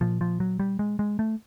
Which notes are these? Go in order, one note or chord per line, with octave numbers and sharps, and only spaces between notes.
A#2 F3
F3
F#3
G3
G#3
G#3
A3